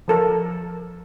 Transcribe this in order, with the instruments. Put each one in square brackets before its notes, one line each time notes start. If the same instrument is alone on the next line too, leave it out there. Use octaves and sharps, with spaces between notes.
[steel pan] F3 A4 A#4